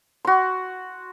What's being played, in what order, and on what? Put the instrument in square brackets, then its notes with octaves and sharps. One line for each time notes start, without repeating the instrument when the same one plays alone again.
[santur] F#4 C6